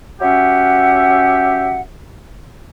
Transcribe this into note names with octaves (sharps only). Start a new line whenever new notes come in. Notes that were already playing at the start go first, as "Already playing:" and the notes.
F#3 C#4 G4 E5 F#5